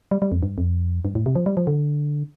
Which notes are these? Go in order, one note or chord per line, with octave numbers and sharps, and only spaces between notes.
G3
G3
F2
G2
F2
G2
A2
C3
F3
G3
F3
D3